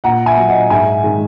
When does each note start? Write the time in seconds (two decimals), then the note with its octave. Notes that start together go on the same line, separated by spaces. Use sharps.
0.04 A#2 F#5 A#5
0.26 E5 G#5
0.37 F#3
0.48 D#5 F#5
0.70 G#2 E5 G#5
1.03 D#3 G#3